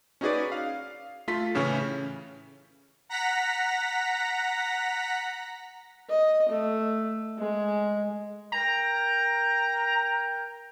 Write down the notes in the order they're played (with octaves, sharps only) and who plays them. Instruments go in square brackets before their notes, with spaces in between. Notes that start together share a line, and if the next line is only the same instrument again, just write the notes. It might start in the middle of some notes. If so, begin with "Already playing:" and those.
[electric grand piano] C#4 D#4 F#4 G#4 B4 D5
F5
A3 F4 C6 B6
A2 C#3 E3 C#4
[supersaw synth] F#5 A#5 A#6 B6
[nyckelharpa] D#5
A3
G#3
[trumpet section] A#4 G5 [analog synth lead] A#5